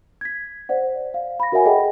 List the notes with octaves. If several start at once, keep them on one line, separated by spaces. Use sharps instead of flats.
G#6 B6
C5 D5 F#5
F5
B5 A#6
F#4 A#4 C#5 E5 F#5 G#5
G#4 A4 D#5 F#5 G5